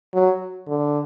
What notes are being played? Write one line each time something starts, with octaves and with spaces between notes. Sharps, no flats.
F#3
D3